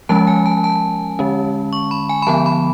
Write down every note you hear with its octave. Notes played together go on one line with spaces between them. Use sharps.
F3 G#3 C#4 A5
G#5
A5
A5
D3 G#3 C#4
C#6
B5
G#5
B5
D3 F3 B3 A5
B5